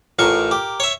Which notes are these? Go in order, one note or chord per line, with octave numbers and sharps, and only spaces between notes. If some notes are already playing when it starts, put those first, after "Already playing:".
A1 A2 F4 A#4 C#6
G4 D6
C#5 E5